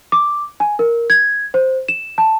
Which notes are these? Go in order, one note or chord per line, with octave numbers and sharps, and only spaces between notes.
D6
G#5
A#4
G#6
C5
E7
A5